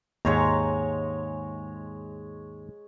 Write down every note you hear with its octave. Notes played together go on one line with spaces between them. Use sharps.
D#2 G#2 G#3 C#5 A#5